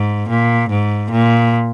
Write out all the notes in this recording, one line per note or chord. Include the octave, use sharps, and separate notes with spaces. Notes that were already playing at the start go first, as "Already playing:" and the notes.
Already playing: G#2
A#2
G#2
A#2